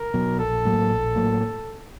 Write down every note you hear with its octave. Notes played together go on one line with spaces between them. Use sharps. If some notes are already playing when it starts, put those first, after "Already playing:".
Already playing: A#4
B2 F#3
A#1 A4
A2 F#3 A#3
A#1
A2 F#3 A#3